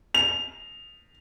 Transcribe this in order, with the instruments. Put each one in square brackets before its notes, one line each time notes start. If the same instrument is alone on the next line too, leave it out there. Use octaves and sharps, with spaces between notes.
[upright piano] F7